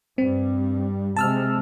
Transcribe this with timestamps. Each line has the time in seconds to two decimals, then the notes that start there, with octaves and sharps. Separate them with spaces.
0.18 G2 G3 C4
1.16 C3 G#3 A5 E6 F6